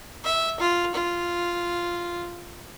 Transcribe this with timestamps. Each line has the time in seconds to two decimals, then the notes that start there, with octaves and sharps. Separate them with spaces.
0.24 E5
0.60 F4
0.95 F4